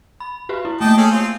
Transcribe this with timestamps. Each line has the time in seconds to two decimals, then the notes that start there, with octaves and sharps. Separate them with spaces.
0.20 B5
0.49 F#4 G4 B4
0.65 E4
0.81 A3 A#3 D#5 G5 A5
0.98 C#4 G#4 A4
1.11 C4 F4